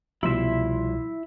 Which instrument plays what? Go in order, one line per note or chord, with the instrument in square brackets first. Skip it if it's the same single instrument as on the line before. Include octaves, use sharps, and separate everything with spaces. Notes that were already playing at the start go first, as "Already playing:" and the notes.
[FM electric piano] C2 B2 C6 [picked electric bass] F3 G3 [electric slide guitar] E4 E5